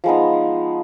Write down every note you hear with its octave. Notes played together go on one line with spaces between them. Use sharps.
F3 G#3 B3 D#4